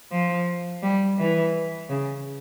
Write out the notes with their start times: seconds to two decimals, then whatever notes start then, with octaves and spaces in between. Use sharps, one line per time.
0.12 F3
0.83 G3
1.18 E3
1.90 C#3